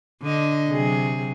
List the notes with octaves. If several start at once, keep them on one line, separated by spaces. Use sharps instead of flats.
D3 D#5
C3 F#3 G#4